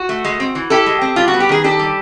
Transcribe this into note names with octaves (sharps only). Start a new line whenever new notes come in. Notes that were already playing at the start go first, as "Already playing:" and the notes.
Already playing: F#4
A3
G#3
C4
E3
E4 G4 A4
G#3
C4
G3 F4
F#4
B3
G4
D#3 G#4
D4 G4 A4
G3